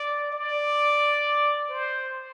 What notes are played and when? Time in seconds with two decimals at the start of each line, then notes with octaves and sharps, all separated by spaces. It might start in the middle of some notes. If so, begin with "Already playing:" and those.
Already playing: D5
0.32 D5
1.69 C5